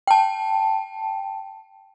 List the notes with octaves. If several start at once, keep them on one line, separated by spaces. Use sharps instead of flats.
G5 A5